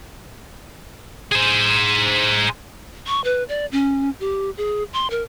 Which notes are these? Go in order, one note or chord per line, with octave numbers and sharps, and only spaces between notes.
G#4 C5
C#6
B4
D5
C#4
G4
G#4
C6
A#4